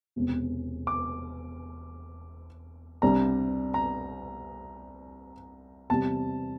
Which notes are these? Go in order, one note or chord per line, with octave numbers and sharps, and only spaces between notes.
E1 E2 C3
D6
C2 C3 G3 D4 A#5
A#5
E2 C3 G3 A5